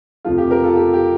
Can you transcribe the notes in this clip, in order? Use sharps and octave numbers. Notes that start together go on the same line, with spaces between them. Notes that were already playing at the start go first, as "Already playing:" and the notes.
F2 C3 F3 A3 F4
G4
G4 A#4
F4 A4
G4
G4